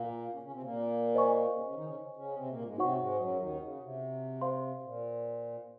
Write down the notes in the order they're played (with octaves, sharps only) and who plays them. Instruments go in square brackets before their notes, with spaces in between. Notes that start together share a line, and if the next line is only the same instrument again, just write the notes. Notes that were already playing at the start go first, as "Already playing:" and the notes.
Already playing: [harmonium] A#2 A#3 [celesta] F4 A#4 F5
[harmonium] C#3 C#4
C#3 C#4
C3 C4
A#2 A#3
[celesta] C5 D#5 G#5 C#6
[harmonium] C#3 C#4
C#3 C#4
D#3 D#4
C#3 C#4
C#3 C#4
C3 C4
A#2 A#3
G#2 G#3
[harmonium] C3 C4 [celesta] D#4 F#4 C#5 F#5 C#6
[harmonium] G#2 G#3
F#2 F#3
D#2 D#3
C#3
C3
[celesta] C5 F5 C6
[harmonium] A#2